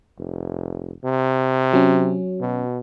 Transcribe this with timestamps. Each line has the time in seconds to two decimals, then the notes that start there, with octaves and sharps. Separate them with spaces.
0.19 F1
1.04 C3
1.73 F#3 C#4
2.40 B2